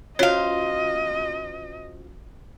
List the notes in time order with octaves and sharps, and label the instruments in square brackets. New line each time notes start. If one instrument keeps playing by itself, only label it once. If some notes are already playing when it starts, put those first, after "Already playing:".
[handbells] C#4 F4 F#4 [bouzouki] C5 F5 [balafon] C#5 [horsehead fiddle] D#5